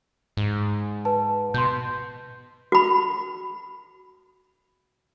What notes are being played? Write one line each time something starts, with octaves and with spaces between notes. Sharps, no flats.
G#2
B4 A5
B2 C6 G6
F#4 B5